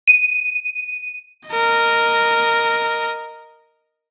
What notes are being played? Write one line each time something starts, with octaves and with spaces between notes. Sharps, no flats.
D#7
A#4 D#5